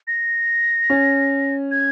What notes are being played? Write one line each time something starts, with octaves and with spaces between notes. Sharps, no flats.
A#6
C#4
G#6